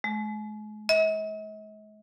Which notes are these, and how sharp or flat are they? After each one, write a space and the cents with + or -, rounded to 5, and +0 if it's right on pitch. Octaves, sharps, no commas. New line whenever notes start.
G#3 +40
D#5 +45